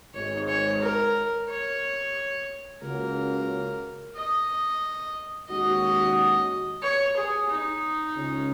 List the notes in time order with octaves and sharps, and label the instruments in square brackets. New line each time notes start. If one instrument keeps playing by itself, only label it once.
[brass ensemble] G#1 G#2 G#3 [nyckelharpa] C#5
[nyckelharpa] C#5
A#4
C#5
[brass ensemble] C#2 C#3 A#3 C#4 F#4 [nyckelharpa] A#4
[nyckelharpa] D#5
[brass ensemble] D#2 D#3 G#3 C#4 F#4 [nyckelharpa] D#5
[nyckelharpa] C#5
G#4
D#4
[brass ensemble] C#2 C#3 G#3 C#4